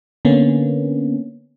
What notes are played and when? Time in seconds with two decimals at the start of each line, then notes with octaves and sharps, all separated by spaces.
0.25 D3 A#3 B3 C#4